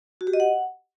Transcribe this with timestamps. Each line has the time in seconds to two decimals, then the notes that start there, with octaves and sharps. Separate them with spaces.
0.21 F#4
0.27 G4
0.33 D#5
0.40 F#5